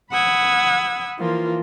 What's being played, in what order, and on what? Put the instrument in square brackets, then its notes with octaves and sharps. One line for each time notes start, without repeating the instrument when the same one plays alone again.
[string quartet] F#5 B5 D#6 E6 G#6
E3 F3 A#3 F4